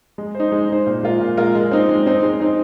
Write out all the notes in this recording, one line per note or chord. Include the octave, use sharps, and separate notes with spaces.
G#3
C5
D#4
G#3
D#4 C5
A#2
G#3 F4 A#4
A#2
G#3 F4 A#4
G#3
C4 D#4
G#3
C4 D#4
G#3
C4 D#4